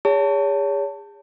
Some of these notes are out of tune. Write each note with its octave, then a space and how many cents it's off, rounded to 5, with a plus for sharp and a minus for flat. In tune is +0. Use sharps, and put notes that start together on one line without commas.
G#4 -35 C#5 +30 A5 +20